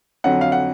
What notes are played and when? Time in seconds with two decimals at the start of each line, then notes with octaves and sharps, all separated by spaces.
0.24 F2 D3 F#3 F#5
0.41 F5
0.52 F#5